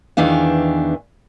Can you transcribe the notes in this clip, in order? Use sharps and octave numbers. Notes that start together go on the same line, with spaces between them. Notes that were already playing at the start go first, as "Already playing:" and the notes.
E2 D#3 E3 D4 F5